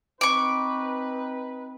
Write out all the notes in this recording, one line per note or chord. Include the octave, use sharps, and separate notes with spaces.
C4 D#4 B4 C#6 D6